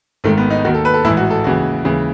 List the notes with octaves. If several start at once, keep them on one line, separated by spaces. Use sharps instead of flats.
G#1 G#2 D#3 A3
B3
D#4
D#2 D#3 F#4
A4
B4
A4
A1 G#2 E3 E4
F#4
A4
D#2 C#3 E3 F#4
D#2 C#3 E3